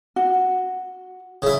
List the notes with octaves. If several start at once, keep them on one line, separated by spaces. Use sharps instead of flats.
F#4
C#3 E4